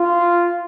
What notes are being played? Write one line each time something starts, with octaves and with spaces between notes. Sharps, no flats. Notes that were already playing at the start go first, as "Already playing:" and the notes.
Already playing: F4